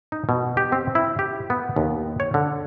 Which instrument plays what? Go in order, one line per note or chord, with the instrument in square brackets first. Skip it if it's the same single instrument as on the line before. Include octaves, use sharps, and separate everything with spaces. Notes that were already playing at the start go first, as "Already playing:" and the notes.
[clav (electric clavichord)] D#4
B2
G4
C4
E4
G4
B3
D#2
C#5
D3